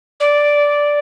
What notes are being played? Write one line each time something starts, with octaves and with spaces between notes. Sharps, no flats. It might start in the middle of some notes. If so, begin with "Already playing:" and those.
D5